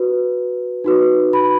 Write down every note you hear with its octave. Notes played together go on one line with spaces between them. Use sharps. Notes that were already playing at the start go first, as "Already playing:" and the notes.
Already playing: F#4 B4
D#4 F#4 B4
B5